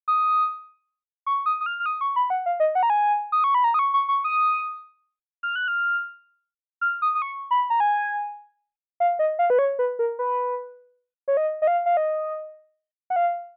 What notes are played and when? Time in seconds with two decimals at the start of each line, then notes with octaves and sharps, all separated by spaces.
0.08 D#6
1.26 C#6
1.46 D#6
1.61 D#6
1.66 F6
1.80 F6
1.86 D#6
2.01 C#6
2.16 B5
2.30 F#5
2.46 F5
2.60 D#5
2.75 F#5
2.83 A#5
2.90 G#5
3.32 D#6
3.44 C#6
3.54 B5
3.64 A#5
3.74 D#6
3.79 C#6
3.94 C#6
4.09 C#6
4.24 D#6
5.43 F6
5.56 F#6
5.68 F6
6.81 F6
7.02 D#6
7.15 D#6
7.22 C#6
7.51 B5
7.70 A#5
7.80 G#5
9.00 F5
9.19 D#5
9.39 F5
9.50 B4
9.59 C#5
9.79 B4
9.99 A#4
10.19 B4
11.28 C#5
11.37 D#5
11.62 D#5
11.67 F5
11.86 F5
11.97 D#5
13.10 F#5
13.16 F5